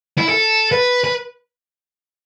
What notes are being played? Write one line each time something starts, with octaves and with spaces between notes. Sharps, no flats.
E4
A4
B4
B4